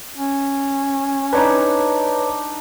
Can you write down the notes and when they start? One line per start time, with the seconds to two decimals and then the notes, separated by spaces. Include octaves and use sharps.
0.17 C#4
1.33 D4 D#4 B4 C#5